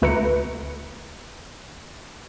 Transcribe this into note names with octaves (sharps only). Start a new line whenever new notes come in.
D2 A3 B4 A#5 E6 C#7